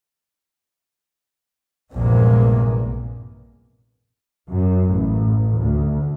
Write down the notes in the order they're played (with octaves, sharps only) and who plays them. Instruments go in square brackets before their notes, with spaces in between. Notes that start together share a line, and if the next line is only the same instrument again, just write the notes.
[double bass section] A#1 E2 G2 C3 G#3 A#3
F#2
A1
D2